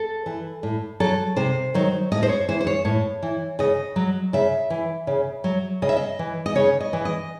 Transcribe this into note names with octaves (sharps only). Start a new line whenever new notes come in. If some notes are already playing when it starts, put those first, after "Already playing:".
Already playing: A4
E3
A2
F#3 A4
C3 C5
D#3 F#3
A2 D#5
C5
C#5
E3 C5
C5
C#5
A2 C#5
E3
C#3 D#5
F#3
C#3 E5
E3
C#3
F#3
C#3 D#5
E5
D#5
E3
D#5
C#3 C#5
D#5
E3
D#5